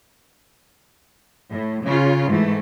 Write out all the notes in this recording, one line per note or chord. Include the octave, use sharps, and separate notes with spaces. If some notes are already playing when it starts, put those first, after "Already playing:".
A2
C#3 F4
G#2 E3 A3